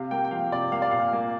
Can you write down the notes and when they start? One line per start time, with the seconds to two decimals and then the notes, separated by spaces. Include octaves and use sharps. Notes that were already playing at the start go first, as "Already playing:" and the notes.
Already playing: C3 F5
0.11 A#3 G5
0.25 G5
0.31 F3 F5
0.51 C3 D5
0.72 A#3 F5
0.82 D5
0.91 A#2 F5
1.13 A#3